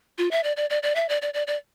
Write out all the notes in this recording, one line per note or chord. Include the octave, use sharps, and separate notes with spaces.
F4
E5
D5
D5
D5
D5
E5
D5
D5
D5
D5